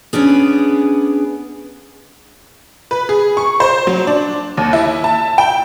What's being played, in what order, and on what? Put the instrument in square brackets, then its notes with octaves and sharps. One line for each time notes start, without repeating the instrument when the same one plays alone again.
[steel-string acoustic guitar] B3 C#4 D4 G#4
[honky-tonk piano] B4
G#4
C#6
C5
F#3
D4
D#2
E4
A5
G5